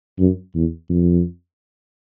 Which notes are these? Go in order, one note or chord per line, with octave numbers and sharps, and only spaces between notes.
F#2
E2
F2